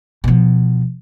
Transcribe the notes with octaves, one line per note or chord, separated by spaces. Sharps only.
B2 F3